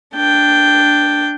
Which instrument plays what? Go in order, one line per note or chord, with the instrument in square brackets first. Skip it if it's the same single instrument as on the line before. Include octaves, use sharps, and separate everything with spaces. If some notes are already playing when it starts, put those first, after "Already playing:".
[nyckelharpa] D4 G5